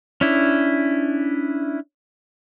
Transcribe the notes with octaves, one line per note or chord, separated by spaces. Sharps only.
C#4 D4 E4